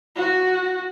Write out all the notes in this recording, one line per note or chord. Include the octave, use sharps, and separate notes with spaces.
F#4